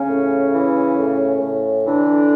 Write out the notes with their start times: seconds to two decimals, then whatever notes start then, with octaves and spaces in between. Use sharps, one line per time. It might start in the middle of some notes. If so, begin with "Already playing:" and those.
Already playing: C#3 C#4
0.09 A2
0.53 E3
0.98 A2
1.41 A2
1.84 D3 E3 D4